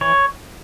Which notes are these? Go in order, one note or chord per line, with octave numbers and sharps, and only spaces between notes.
E3 C#5